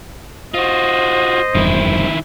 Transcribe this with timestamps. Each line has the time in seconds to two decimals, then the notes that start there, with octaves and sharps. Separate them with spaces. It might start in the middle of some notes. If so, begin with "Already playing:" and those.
0.54 F4 F#4 C5 D#5
1.55 F1 E2 G2 D#3 E4